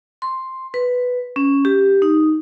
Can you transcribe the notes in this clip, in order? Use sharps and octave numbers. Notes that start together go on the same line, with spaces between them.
C6
B4
C#4
G4
D#4